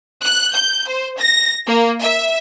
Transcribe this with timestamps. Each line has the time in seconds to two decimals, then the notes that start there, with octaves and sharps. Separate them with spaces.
0.24 F#6
0.54 G6
0.88 C5
1.18 A#6
1.66 A#3
2.01 E5